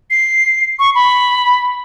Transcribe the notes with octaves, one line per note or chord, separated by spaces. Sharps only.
C7
C#6
B5